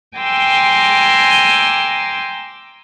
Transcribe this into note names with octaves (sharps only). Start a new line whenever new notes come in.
G5 G#5 A#5 C6 D6 E6